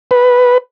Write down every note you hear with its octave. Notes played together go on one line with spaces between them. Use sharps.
B4